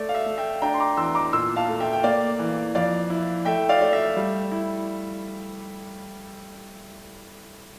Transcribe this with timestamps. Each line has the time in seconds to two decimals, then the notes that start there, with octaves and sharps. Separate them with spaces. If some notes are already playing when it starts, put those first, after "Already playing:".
Already playing: A3 D5
0.09 F5
0.15 E5
0.26 A3
0.38 E5 G5
0.62 D4 G5 A#5
0.74 C6
0.80 A#5 D6
0.97 E2 C6 E6
1.15 A#5 D6
1.33 A#2 C6 E6
1.56 F5 A5
1.68 A3
1.80 E5 G5
1.93 G5
2.04 A#3 D5 F5
2.39 E3
2.75 F2 D5 F5
3.10 E4
3.45 A3 E5 G5
3.69 D5 F5
3.81 A3 D5
3.93 E5
4.17 G3
4.52 E4